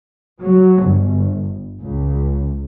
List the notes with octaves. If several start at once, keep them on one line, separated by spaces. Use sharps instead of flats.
F#3
G1
C#2